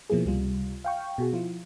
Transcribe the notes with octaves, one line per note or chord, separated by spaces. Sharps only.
B2 F3 A#3 E4 G#4
C#2 C3 G3 F4
F5 G5 C#6
B2 F#4 G#4
F3 E4 F4